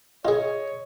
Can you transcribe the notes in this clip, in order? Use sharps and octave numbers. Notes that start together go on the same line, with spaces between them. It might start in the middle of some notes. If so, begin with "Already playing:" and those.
F4 G#4 C#5 D#5